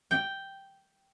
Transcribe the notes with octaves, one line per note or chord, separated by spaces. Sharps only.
G5